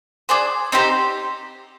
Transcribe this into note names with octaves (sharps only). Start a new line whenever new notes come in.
D4 G#4 C5
C4 D#4 G4 C5